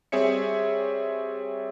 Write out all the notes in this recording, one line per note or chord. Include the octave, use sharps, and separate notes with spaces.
G3 C4 G#4 C#5 E5 C#7